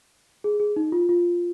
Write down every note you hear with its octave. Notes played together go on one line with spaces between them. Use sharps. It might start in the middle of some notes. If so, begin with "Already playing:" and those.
G#4
G#4
D#4
F4
F4